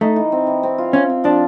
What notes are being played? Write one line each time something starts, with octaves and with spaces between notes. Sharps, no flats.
A3 D#4
E3
C4
E3
C4
F4
C4 C#4
C4
F3 D4